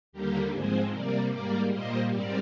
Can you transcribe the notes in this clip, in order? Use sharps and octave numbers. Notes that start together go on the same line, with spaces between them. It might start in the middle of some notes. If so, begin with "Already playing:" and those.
D#2 D3 G3 A#3 G4 A#4
G#2 F3 G#3 C4 G#4 C5
C3 G3 A#3 A#4 D5
G#2 G3 A#3 A#4 D5
A#2 G3 A#3 C5 D#5
G#2 G3 C4 A#4 D5